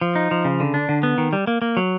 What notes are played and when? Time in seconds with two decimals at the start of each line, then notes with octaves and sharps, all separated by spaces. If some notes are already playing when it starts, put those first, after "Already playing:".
0.01 F3
0.15 D#4
0.31 F3
0.45 C#3
0.60 D3
0.74 D4
0.89 D3
1.03 B3
1.18 D#3
1.33 G3
1.47 A#3
1.62 A#3
1.77 F#3